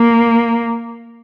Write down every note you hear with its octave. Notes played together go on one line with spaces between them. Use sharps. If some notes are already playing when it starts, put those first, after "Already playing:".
Already playing: A#3